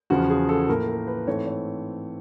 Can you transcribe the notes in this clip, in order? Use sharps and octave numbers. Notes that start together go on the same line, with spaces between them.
E2 C#3 F3 F#4
G#4
A4
A2 F3 A#3 A#4
A#4
B4
G#2 E3 A3 C4 C#5
C#5